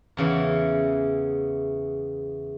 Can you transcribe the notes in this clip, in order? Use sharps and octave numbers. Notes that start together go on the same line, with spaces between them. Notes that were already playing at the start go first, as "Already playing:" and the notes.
E2 C#3 E3